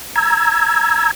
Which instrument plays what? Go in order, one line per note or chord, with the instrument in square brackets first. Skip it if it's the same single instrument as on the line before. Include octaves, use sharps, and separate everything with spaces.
[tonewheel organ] A#5 E6 G#6